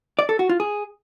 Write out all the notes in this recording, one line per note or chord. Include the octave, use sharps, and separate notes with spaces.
D5
A4
F#4
F4
G#4